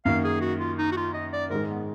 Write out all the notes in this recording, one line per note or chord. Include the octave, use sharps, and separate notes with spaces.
F#2 D#3 A#3 F5
G#4
F#4
F4
D#4
F#4
F4
D#5
D5
G#2 D#3 G#3 A#4
B3